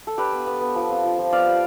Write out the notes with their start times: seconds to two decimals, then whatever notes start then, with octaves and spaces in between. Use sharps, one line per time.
0.07 A4
0.18 D4 G4 B4
0.33 B3
0.46 B3
0.61 B3
0.75 F3
0.89 C4
1.04 F3
1.19 F3
1.32 B3 D5 F5
1.47 G3